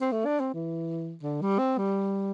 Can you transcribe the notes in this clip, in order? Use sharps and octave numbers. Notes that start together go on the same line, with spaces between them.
C4
A3
D4
C4
E3
D3
G3
C4
G3